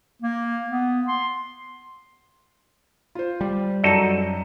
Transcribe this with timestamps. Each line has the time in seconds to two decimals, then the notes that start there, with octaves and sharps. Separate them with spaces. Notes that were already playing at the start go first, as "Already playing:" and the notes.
0.22 A#3
0.70 B3
1.08 C6
3.15 F4 C5
3.41 G3
3.84 F#2 D#4 F#4 A4 D5 A#5 E7